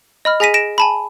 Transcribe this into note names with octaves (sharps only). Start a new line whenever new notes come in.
D#5 B5 F6
G#4 G#5 A#6 B6 D#7
A#6 D7 E7
G#5 A5 B5